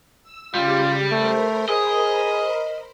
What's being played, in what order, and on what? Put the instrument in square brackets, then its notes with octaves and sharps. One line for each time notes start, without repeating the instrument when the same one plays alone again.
[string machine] E6
[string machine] C#3 G4 D6 [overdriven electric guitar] G3 [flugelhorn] F4
[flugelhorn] A3 [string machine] A#4 C5 B5
[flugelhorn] G#4 [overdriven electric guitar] D#5